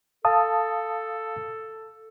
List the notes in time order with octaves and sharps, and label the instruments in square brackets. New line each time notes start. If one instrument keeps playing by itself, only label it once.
[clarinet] A4 [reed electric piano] F5 A5 D#6